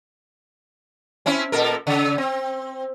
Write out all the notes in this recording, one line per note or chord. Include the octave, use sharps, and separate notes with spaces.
C4 C#4 E4
A#2 A4 A#4
C#3
C4